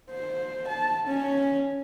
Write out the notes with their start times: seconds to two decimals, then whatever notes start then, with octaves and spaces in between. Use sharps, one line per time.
0.10 C5
0.68 A5
1.07 C#4